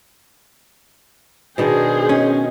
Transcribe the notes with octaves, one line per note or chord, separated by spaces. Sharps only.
B2 D#3 D4 G#4 C5
C#4 D#5